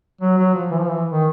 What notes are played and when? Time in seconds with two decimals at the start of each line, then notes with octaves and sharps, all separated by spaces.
0.21 F#3
0.37 F#3
0.54 F3
0.71 E3
0.79 F3
0.88 E3
1.10 D#3